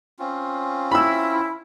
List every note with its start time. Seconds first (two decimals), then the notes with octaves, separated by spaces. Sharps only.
0.19 C4 C#4 F4
0.92 E4 B5 E6